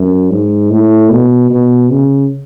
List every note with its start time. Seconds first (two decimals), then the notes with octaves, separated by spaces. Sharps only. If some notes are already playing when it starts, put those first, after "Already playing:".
Already playing: F#2
0.31 G#2
0.70 A2
1.10 B2
1.50 B2
1.90 C#3